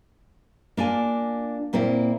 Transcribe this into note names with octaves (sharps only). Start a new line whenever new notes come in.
A#3 D4 F4 G#5
A#2 A#3 C4 C#4 E4